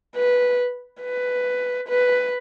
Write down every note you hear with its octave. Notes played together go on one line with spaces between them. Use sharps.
B4
B4
B4